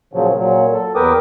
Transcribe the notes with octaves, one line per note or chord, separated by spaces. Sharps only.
A#2 C#3 F3 F#3
A#2 F#3
A4
E2 A#4 B4 G5 D6 D#6